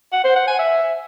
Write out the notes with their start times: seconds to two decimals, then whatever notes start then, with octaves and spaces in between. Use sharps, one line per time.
0.13 F#5
0.24 C5
0.36 F#5
0.47 G#5
0.59 E5